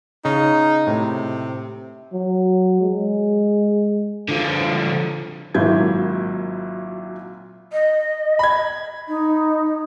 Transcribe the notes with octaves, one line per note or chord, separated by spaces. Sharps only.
C#3 D#4
A2 C3
F#3
G#3
D3 F3
G#1 A#2 F#3 E4 G6 G#6
D#5
B5 G#6
D#4